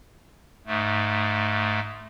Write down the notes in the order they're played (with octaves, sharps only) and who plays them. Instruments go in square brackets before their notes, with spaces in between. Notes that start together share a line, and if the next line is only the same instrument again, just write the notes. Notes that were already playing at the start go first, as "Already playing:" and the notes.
[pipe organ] G#2 A3